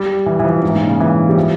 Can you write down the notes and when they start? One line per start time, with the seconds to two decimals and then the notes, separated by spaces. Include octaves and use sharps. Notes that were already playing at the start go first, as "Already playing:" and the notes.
Already playing: G3
0.26 E3
0.39 E3
0.44 F3
0.63 G#2
0.75 A#2
0.87 C#3
1.00 E3
1.29 G3
1.36 F3